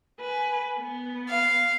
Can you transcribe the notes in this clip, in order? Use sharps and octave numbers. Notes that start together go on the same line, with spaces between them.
B4 G#5
B3
F5